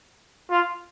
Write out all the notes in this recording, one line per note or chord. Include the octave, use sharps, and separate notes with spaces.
F4